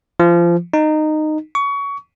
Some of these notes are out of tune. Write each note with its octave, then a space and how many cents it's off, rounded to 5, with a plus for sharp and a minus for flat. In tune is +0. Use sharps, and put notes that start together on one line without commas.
F3 -25
D#4 -15
C#6 +25